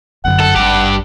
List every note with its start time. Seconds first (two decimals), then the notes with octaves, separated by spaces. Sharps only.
0.24 G1 F#2 D3 F#5
0.40 A4
0.56 G#1 G2 G4